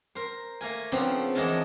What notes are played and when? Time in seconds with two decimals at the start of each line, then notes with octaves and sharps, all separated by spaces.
0.15 A#4 C5
0.61 A3 A#3 A#4 G#5
0.92 C#3 F3 B3 C4 D4
1.35 E2 F3 G#3 A#4 A5